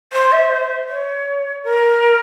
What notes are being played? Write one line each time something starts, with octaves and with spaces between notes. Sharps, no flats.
C5
E5
C5
C#5
A#4